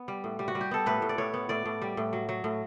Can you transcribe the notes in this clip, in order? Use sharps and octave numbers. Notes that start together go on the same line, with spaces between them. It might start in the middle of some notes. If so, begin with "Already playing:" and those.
Already playing: B3
G3
A2
G3
F#4
G3
G4
B3 A4
A2 B4
A2
D5
A2 C#5
B3
A2 D5
A2
G3
A2
F#3
F#3
A2